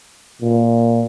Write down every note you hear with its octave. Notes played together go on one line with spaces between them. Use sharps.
A#2